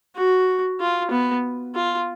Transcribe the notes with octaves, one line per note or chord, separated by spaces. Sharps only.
F#4
F4
B3
F4